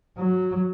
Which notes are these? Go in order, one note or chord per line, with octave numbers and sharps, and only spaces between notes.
F#3